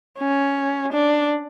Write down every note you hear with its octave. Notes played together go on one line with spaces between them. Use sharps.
C#4
D4